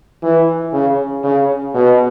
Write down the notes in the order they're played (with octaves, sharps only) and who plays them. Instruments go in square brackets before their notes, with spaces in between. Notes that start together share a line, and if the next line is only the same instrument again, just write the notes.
[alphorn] E3
C#3
C#3
B2